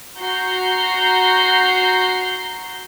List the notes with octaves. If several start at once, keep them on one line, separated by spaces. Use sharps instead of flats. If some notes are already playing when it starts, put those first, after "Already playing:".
F#4 A#5 G6 C7